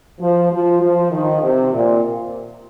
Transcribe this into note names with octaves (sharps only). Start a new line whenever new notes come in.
F3
F3
F3
D#3
C3
A#2